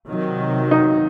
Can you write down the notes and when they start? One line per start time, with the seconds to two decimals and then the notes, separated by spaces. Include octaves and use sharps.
0.08 C3 D#3 F#3
0.71 D#4